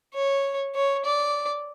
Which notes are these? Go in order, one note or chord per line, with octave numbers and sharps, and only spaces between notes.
C#5
C#5
D5